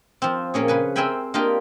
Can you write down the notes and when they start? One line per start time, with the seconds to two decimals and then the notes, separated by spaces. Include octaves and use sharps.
0.22 F3 C4
0.54 A#2 A#3 C#4 G#4
0.68 C#3 B4 G#5
0.96 C4 A#4 E5 G5 G#5 B5
1.34 A#3 D4 F4 G4 D#5